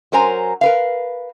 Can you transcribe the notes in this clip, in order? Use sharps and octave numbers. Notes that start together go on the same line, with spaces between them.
F#3 C#4 A#4 C5 G#5 A#5
A#4 B4 F5